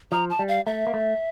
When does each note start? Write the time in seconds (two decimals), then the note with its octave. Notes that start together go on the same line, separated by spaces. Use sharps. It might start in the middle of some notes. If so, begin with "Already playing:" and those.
0.12 F3 A#5
0.30 A5
0.39 G3
0.48 F5
0.66 A3 E5
0.87 A#3
0.94 A3